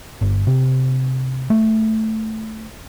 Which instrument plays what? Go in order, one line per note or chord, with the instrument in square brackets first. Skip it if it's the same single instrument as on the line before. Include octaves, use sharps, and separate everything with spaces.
[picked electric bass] G1
C3
A3